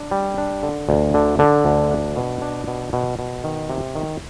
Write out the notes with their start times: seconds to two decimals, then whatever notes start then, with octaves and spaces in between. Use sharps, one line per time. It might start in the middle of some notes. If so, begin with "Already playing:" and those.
Already playing: D4
0.11 G3
0.38 D4
0.63 D3
0.89 D2
1.14 D3
1.39 D3
1.65 D2
1.91 D4
2.16 B2
2.42 D4
2.68 B2
2.93 B2
3.19 B2
3.44 D#3
3.70 C3
3.95 D#3